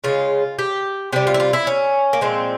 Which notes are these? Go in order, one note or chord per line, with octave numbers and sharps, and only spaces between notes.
C#3 F3 G#3 F4
G4
C3 G3 G4
F4
E4
F4
E4
C#4
A#3
A#2 F3 G#3 C4